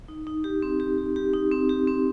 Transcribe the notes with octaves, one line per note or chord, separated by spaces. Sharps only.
D#4
D#4
G4
C4
G4
G4
G4
D#4
C4
G4
C4